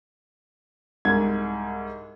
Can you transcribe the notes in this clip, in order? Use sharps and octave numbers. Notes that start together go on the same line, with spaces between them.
C2 G#2 G#6